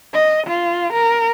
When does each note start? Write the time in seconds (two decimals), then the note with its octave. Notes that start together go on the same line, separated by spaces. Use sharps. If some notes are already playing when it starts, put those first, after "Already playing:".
0.14 D#5
0.47 F4
0.93 A#4